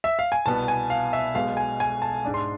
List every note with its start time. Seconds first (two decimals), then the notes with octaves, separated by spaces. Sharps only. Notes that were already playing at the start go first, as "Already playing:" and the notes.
0.04 E5
0.19 F5
0.32 G#5
0.46 C2 B2 B3 A5
0.68 G#5
0.90 F5
1.13 E5
1.35 B1 B2 G#3 F5
1.57 G#5
1.80 G#5
2.02 A5
2.25 G#2 G#3 D4
2.34 C6